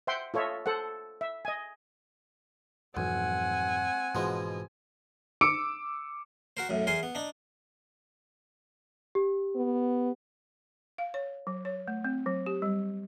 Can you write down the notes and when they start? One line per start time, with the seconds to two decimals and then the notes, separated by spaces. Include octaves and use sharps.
0.07 C5 E5 F#5 G5 C6
0.34 F4 A4 C#5 D#5 E5
0.66 A4 C5 F#5
1.21 E5
1.45 D#5 G#5
2.97 B1 F2 G#2 E3 C4 F#5 G#5
4.15 G#2 B2 E3 F3 G#3
5.41 D6 E6 C#7 D7
6.57 F#4 A#4 C5
6.69 B1 F#2 A2
6.87 E2 A#4 C5 G#5 C6
7.03 B3
7.15 D4 D#4
9.15 G4
9.56 B3
10.98 F5
11.14 C#5
11.47 F#3
11.65 C#5
11.88 A3
12.04 C4
12.26 F#3
12.46 G4
12.62 G3